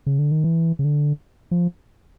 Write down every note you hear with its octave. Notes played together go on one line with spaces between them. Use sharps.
C#3
D3
D#3
E3
C#3
D3
F3